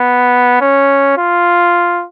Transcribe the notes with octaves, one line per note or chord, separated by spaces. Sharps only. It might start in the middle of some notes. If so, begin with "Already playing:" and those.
Already playing: B3
C#4
F4